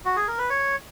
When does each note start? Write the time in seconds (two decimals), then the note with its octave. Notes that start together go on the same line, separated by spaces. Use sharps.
0.05 F#4
0.16 G#4
0.28 A#4
0.38 B4
0.50 C#5